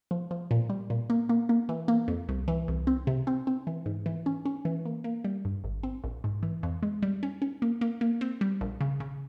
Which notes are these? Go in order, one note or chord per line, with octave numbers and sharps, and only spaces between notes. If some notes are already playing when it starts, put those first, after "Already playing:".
F3
F3
A#2
G3
A#2
A#3
A#3
A#3
E3
A#3
F2
C2
E3
C2
C4
C3
C4
C4
E3
G#2
E3
C#4
C#4
E3
A#3
A#3
G3
G2
G#1
C4
A#1
G#2
E3
F2
G#3
G3
C#4
C#4
A#3
A#3
A#3
C4
G3
A#1
C#3
C#3